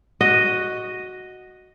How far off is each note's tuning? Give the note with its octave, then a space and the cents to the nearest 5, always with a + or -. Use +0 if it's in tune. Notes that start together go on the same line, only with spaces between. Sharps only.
F#4 +0 D#5 +0